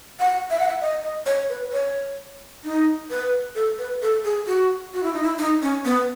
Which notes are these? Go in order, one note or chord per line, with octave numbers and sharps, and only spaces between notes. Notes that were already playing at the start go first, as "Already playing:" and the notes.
F#5
E5
F#5
E5
D#5
D#5
C#5
B4
C#5
D#4
B4
A4
B4
A4
G#4
F#4
F#4
E4
D#4
E4
D#4
C#4
B3